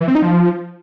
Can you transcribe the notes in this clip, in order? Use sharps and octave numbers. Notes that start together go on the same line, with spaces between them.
E3
C4
D#4
F3